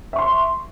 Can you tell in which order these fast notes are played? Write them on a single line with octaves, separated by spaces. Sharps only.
E5 C#6 C6